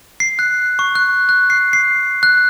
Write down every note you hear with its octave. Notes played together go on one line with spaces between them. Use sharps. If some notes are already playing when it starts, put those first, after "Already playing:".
C7
F#6
C#6
F#6
F#6
C7
C7
F#6